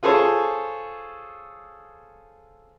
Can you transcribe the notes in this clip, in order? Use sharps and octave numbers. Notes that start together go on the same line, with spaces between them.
F4 G#4 A4 C5 C#5